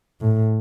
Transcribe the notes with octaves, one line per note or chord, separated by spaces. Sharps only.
A2